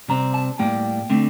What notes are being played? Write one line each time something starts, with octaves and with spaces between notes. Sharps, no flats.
C3 G3 C4 A#5
A5
A2 G3 A#3 G5
D3 A3 C4